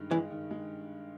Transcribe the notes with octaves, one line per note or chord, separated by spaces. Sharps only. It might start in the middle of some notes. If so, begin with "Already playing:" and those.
Already playing: G2 D#3 G#3
E3 G#3
D#3
G#3